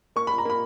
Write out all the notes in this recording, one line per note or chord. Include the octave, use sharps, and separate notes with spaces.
A#3 C#6
A#3 B5
A#5
A#3 B5